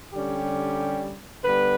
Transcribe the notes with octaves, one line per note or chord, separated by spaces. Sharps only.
D3 G3 C#4 G4
D3 G3 B3 B4